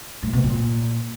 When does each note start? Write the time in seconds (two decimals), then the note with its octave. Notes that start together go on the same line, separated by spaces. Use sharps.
0.23 A2
0.33 B2
0.44 A#2